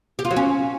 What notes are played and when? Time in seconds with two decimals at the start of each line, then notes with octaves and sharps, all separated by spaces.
0.19 G4
0.25 F4
0.31 F#3
0.36 C#4